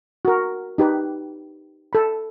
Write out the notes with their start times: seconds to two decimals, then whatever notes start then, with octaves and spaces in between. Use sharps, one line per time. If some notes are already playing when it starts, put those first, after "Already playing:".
0.25 F#4 A#4
0.78 D#4 G4 B4
1.93 A4 B5